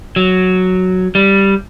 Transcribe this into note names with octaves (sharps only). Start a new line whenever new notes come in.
F#3
G3